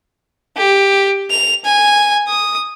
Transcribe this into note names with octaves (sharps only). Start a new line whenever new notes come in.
G4
F7
G#5
D#6